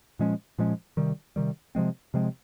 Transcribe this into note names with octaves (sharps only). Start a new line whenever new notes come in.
A#2 F3 G#3 C#4
A#2 F3 G#3 C#4
C3 D#3 G3
C3 D#3 G3
C3 F3 G#3 C4
C3 F3 G#3 C4